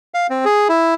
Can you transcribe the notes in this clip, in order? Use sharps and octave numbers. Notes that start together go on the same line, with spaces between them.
F5
C4
G#4
E4